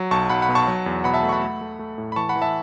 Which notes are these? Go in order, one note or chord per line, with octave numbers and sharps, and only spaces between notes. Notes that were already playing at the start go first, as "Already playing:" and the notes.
Already playing: F#3
B1 A5 C#6
B1 F#5 B5
F#5 B5
B2
A5 C#6
F#3
E2
B2 F#5 B5
E5 A5
A3
C#6
F#5 B5
A3
A3
A3
A2
B5
E3 A5 C#6
F#5 B5
E3
E5 A5